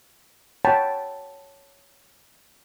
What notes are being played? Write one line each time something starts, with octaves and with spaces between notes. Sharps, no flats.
C#5 F#5 G5 A5 B5